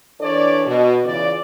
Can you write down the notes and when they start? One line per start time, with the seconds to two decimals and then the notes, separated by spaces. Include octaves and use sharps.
0.20 E3 D4 A4 C#5 D5
0.65 B2
1.04 C#3 E3 F4 D5